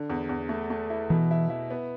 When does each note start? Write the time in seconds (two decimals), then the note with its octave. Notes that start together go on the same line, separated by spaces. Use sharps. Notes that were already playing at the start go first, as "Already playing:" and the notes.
Already playing: D3
0.09 E2
0.29 E2
0.49 A3
0.70 A3
0.90 E4
1.10 B2 E3
1.31 E4
1.50 E4
1.70 B3